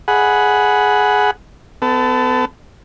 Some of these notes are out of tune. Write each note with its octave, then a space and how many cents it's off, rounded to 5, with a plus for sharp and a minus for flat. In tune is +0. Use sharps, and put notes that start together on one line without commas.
G#4 +10 F#5 +0 B5 +0
B3 +35 A4 +0